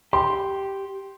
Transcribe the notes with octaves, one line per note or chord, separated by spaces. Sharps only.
G4 C6